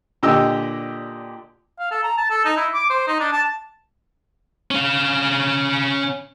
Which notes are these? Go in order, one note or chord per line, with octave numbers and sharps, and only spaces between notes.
A#2 D3 G4 D#5 G5 E6
F5
A4
A#5
A5
A4
D#4
E4
D6
C5
D#4
D4
A5
C#4 F5